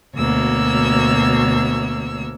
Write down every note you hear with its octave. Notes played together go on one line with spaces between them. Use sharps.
D2 B2 A#3 C#5 E6